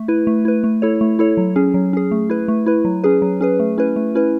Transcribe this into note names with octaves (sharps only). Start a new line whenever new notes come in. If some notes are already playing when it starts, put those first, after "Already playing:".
Already playing: A3
E4 B4
A3
E4 B4
A3
E4 A4 C#5
A3
E4 A4 C#5
F#3
C#4 G#4
F#3
C#4 G#4
A3
E4 B4
A3
E4 B4
F#3
C#4 G#4 B4
F#3
C#4 G#4 B4
A3
C#4 E4 B4
A3
C#4 E4 B4